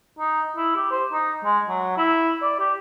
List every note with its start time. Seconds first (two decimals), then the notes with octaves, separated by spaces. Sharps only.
0.19 D#4
0.57 E4
0.76 G4
0.91 C5
1.12 D#4
1.45 G#3
1.69 F#3
1.97 E4
2.42 D5
2.60 G4